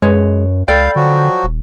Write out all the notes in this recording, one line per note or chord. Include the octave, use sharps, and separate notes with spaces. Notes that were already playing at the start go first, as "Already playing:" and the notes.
F#2 G#3 B4 C#5
C#2 A4 D5 F5 G5 B5
D3 F3 F#3 F#4
D#1